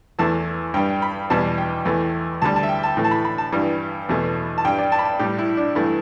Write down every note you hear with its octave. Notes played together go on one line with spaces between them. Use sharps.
E2 E3 A3 A5
G2 G3 G5
B5
E2 B2 G3 A5
G5
E2 E3 A3
D2 D3 G3 A5
A5
E5
G5
A5
A2 E3 A3
A5
B5
B5
A5
G2 E3 G3
E2 B2 A3
A5
G2 G3 G5
D5
A5
B5
A5
A2 G3 G4
E4
D4
G2 E3 A3 E4